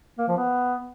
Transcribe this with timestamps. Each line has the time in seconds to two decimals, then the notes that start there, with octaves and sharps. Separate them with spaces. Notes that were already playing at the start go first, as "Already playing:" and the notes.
0.19 A#3
0.28 F3
0.37 B3